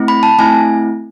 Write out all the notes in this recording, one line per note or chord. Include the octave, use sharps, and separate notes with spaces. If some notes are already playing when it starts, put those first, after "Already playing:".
Already playing: A3 C4 E4
B5
A5
A3 C4 E4 G#5